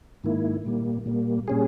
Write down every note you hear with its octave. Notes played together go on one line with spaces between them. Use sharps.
G#2 D#3 A#3 E4
A#2 G3 A#3
A#2 G3 A#3
A#2 G3 C#4 G#4